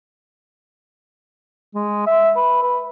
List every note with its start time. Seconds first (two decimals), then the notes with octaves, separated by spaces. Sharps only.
1.75 G#3
2.07 E5
2.36 B4
2.63 B4